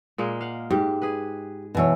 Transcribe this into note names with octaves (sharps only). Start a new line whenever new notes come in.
A#2 G#3 A#3
F5 F#5
G#2 G4
G#4 B4
B2 E3 C#5